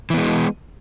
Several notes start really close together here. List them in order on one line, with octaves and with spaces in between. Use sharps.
E3 B3 G#3